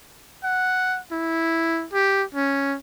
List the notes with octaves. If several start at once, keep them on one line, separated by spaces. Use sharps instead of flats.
F#5
E4
G4
C#4